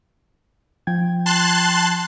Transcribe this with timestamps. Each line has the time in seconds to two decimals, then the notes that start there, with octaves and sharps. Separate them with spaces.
0.87 F3 G5 G#6
1.26 A5 C6 F#6